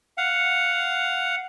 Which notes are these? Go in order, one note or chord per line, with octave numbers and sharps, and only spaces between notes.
F5 F#5